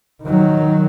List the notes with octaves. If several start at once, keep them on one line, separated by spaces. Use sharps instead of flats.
D#3 F#3